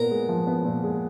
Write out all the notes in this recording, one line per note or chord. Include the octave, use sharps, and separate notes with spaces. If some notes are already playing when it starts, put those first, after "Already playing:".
Already playing: A#2 B3 A#4
G#3
F3
B3
A#2
G#3